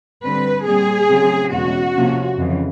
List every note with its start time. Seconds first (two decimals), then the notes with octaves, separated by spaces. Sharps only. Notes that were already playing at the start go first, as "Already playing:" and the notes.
0.24 D3 G3 C4 B4
0.67 A#2 G3 C4 G#4
1.10 C#3 F#3 A3 C4
1.53 E2 B2 G#3 C#4 F#4
1.96 C3 F3 A#3 C#4
2.39 F2 C#3 E3